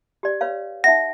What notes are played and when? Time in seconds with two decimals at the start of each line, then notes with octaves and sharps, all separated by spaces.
0.23 G4 D5
0.41 B4 C#5 F5
0.84 D#4 E5 F#5 A#6